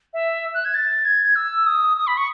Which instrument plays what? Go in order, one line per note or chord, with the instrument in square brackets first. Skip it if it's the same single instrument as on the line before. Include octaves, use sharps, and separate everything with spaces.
[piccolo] E5
F#6
G#6
A6
G#6
E6
D#6
D#6
B5
C#6